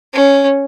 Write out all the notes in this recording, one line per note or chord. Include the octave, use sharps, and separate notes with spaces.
C#4